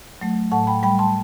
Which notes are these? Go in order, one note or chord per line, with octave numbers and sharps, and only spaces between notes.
F#3 A3
A2 F#5 A5
G5 B5
G3 G5 B5
A5 C6